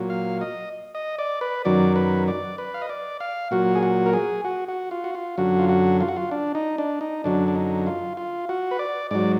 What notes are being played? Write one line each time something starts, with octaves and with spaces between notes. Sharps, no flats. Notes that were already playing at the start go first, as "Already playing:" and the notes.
Already playing: A#2 F#3
F5
D#5
D#5
D5
B4
F#2 D#3 F#3 D5
B4
D5
B4
F5
D#5
D5
F5
A#2 F#3 F#4
G#4
F#4
A#4
G#4
F#4
F#4
F4
F#4
F4
F#2 D3 F#3 F#4
F4
F#4
F4
F#4
F4
D4
D#4
D4
D#4
F#2 D3 F#3 D4
D4
D#4
F4
F4
F#4
B4
D5
G#2 F#3 D5